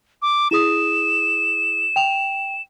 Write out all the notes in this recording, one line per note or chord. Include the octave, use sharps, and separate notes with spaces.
D6
E4 G#4 D#6 E7
G5 F7